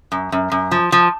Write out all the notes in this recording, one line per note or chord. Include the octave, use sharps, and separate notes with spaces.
F#2
F#2
F#2
F3
F3